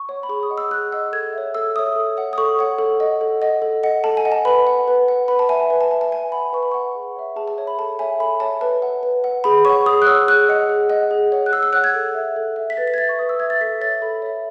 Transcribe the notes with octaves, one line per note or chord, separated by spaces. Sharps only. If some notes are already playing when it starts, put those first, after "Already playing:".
Already playing: C#6
C#5 F#5
B5
G#4 C#6
D#6
D#5 F#5
E6
G#4 F#6
D#5 F#5 E6
A4 G#6
C#5 E5
A4 E6
C#5 E5 D#6
A4
C#5 F#5
D#6
A4 C#6
C#5 F#5
A4
D#5 F#5
A4
D#5 F#5
A4
D#5 F#5
A4 A5
G#5
D#5 F#5
A5
B4 B5
F#5
B4
F#5
B4 B5
A5
E5 G#5
A5
B4 G#5
A5
E5 A5
A5
B4 G#5
F#5 B5
B4 C#6
B5
F#5 C#6
G#4
C#5 E5
G#4 A5
A5
C#5 E5
B5
A4 A5
C#5 E5 G#5
A4 B5
C#5 E5 A5
B4 A5
F#5
B4
F#5
G#4 B5
C#5 F#5 C#6
G#4 D#6
F#6
C#5 F#5 E6
G#4 F#6
D#5 F#5
G#4
D#5 F#5
G#4
C#5 F#5
F#6
G#4 E6
E6
C#5 F#5 F#6
G#6
A4
E5
A4
E5
B6
B4 A6
B6
G#6
E5 A6
C#6
B4 D#6
E6
E5 G#6
A6
A4 B6
C#5 E5 A6
A4 B5
C#5 E5